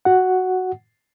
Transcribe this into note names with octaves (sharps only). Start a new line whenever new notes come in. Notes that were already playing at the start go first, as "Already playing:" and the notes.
F#4 F#5